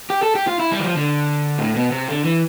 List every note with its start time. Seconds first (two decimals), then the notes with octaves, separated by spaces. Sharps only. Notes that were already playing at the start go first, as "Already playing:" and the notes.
0.10 G4
0.23 A4
0.35 G4
0.48 F4
0.60 E4
0.72 G3
0.80 E3
0.84 F3
0.97 D3
1.58 A2
1.75 B2
1.91 C3
2.08 D3
2.25 E3